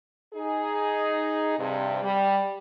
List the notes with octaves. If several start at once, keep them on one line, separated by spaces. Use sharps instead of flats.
D#4 G#4
G2 C3
G3